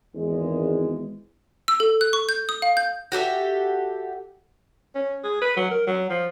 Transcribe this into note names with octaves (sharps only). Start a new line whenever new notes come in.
G#1 E2 G#3
E6
A4
F#6
C#6
G6
D#6
F5
G6
F#4 G4 A4 E5
C#4
G#4
B4
F#3
A#4
F#3
F3